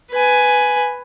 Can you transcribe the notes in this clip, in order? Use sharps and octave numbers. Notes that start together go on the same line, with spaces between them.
B4 G#5